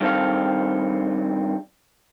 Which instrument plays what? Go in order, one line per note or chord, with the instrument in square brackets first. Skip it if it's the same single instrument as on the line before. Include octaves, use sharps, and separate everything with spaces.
[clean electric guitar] G2 D#3 C4 A4 F5